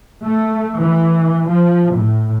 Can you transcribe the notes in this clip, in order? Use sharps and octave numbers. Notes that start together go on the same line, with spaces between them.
A3
E3
F3
A2